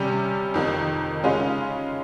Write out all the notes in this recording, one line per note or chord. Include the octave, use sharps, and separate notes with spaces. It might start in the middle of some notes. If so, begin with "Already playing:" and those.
Already playing: C3 G3 C#4
F2 D#3 A#3
C#3 G#3 C#4 F4